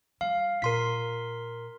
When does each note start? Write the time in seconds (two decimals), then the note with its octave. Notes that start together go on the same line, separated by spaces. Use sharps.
0.21 G3 F5
0.62 A#2 A#4 C6 B6